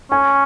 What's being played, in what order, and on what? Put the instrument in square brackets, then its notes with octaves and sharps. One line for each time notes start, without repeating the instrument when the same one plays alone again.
[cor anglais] C#4 [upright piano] G#5